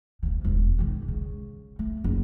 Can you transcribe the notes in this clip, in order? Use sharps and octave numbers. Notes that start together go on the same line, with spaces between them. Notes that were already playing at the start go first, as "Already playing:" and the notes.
D2 D3
E1
D#3 G#3
C#3
A3
F#1